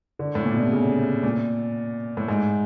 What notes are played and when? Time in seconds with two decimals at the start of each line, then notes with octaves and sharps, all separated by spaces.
0.19 D3
0.35 A2
0.45 A#2
0.54 B2
0.63 C3
0.72 C#3
1.23 A#2
2.17 A2
2.28 G#2